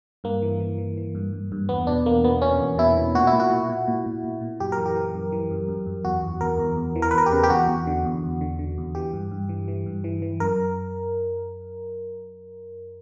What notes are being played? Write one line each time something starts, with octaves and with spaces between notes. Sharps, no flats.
G2 A#3
E3
E3
E3
E3
G2
G2
G2
E2 B3
B2 D4
E2 A#3
B2 B3
B2 C#4
E2
B2 E4
B2
A#2 F#4
E4
A#2
F#4
A#2
A#2
A#2
A#2
A#2
A#2
F#2 G4
A#4
E3
G4
E3
F#2
E3
F#2
F#2
F#2
E2 F#4
E2
E2 A#4
E2
E2
E3
A#4
B4
E2 A#4
G4
C#3
G4
E2 F#4
E2
D3
E2
E2
D3
D3
E2
E3 G4
G2
G2
E3
E3
G2
E3
E3
F#2 A#4